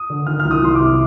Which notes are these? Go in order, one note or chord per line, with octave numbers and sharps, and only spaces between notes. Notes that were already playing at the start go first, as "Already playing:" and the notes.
Already playing: D#6
D3
D#3 F6
C2 F6
D#6
C2 C6
D6
C3